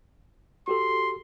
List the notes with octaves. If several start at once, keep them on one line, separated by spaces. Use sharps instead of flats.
F#4 G4 A4 C6